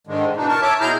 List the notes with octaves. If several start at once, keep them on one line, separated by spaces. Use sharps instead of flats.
G#2 D3 D#3 G#3
B2 E3 D4 D#4
A#4 A5 C#6
C#5 E5 A5 D6
B2 E4 G#4 A#5 F6 G6